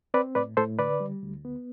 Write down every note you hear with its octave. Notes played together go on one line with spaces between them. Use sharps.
C4 B4 D5
A2 B4 D5
A2 A4 C5
D3 B4 D5
G3
D2
B3